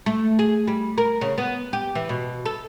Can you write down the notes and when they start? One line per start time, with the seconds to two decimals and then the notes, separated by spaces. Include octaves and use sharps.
0.06 A3
0.39 G#4
0.67 G3
0.98 A#4
1.21 C#3
1.38 B3
1.73 G4
1.95 E3
2.09 B2
2.45 A4